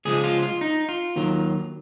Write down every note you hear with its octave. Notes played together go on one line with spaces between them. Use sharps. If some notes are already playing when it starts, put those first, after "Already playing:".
C#2 C#3 F3 G#3 G#4
F4
F4
D#4
F4
D#2 D#3 F#3